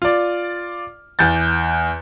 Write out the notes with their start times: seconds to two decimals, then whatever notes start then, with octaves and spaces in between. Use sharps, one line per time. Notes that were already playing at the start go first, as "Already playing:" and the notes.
0.02 F4 D5
1.19 E2 G6 A6